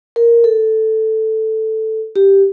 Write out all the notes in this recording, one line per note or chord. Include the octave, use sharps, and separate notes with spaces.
A#4
A4
G4